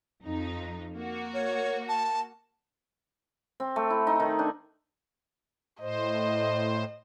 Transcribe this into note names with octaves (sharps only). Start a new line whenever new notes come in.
F2 D#4
A#3 F#4
C#5
A5
C4
A3
E4
D#4
D#3
D4
A2 C5 D#5